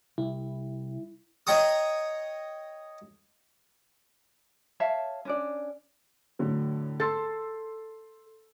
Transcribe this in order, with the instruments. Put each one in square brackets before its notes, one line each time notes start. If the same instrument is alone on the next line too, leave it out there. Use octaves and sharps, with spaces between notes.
[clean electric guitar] C2 [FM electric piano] E4
[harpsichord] C#5 D#5 G5 A#5 C#6 D#6
[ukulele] C#5 E5 F5 A5
C#4 D4 D5
[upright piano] A2 D3 F#3
[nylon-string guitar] A4 [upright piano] C6 E6 A6